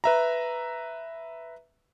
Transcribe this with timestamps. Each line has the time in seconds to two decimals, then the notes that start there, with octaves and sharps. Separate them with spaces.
0.04 B4 E5 A#5